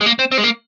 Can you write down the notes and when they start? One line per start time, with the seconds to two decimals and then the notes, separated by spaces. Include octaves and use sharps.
0.01 G#3
0.06 A#3
0.19 C4
0.32 C4
0.38 G#3
0.44 A#3